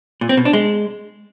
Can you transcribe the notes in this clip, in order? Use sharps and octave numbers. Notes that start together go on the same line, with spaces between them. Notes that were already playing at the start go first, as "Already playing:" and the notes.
A#2
C4
B2
D4
G#3